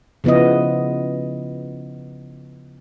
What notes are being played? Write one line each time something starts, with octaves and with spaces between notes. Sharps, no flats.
C#3 F3 B3 E4 D#5